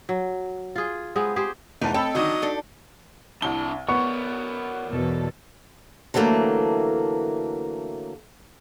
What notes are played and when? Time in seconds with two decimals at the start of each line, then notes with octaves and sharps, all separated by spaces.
0.09 F#3
0.76 F4 G#4
1.16 G#3 B3 C4 G#4
1.36 G4 G#4 C5
1.81 F1 E2 E3 D#4 A#4 A5
1.94 C4 A4 C#5 D#5 G5 A5 B5
2.15 D3 D#3 F#3 D4 D#4 F#4 D#5
2.42 D4 A4
3.42 C2 D4 E4 A5 G7
3.89 B3 A#4 C#5 D5 C#6
4.89 E2 B2 A4
6.14 D3 E3 F#3 A3 A#3